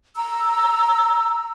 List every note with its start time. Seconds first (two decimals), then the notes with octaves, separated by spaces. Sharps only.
0.16 A#5 E6